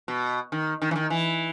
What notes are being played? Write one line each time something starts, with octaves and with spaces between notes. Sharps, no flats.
B2
D#3
D#3
E3
D#3
E3